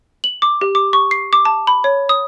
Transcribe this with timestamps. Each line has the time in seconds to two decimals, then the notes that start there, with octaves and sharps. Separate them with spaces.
0.24 F#7
0.42 D6
0.61 G4
0.75 D6
0.93 C#6
1.11 C7
1.33 D6
1.45 A5
1.67 B5
1.84 C#5
2.09 D#6